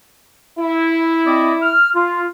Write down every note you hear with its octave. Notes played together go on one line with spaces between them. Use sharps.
E4
C4 D5 D#5
F6
F4